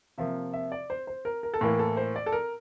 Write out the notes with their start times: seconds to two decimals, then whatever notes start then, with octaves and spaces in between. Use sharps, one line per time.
0.18 C3 F3 A#3 E5
0.54 E5
0.72 D5
0.90 C5
1.07 C5
1.25 A#4
1.43 A#4
1.54 A4
1.61 A2 E3 A#3 A#4
1.79 A4
1.97 C5
2.16 D5
2.26 A4
2.32 A#4